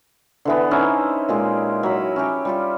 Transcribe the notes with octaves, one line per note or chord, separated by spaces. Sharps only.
D3 E3 B3
C#4 D#4 E4 C5
A#2 G#3 G4
F#3 B5
C#4 E4 G4
G3 F4 G4